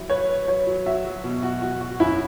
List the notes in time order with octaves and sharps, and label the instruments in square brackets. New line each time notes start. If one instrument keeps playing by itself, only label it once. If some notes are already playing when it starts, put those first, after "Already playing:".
Already playing: [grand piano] F#3 E4
[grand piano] B4 [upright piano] C#5
[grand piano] B4
[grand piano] F#3 [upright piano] C#5
[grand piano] F#3
[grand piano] F#4 [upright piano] E5
[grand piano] F#3
B2
F#4
F#4
F#4
[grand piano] F#2 [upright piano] E4